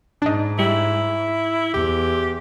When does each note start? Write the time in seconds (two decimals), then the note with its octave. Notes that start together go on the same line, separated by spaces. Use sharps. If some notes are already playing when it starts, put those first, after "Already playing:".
0.22 G#2 D4 D#4
0.59 G3 E4
1.74 E2 G4